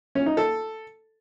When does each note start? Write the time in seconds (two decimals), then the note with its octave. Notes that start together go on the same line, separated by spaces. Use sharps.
0.15 C#4
0.26 D#4
0.37 A4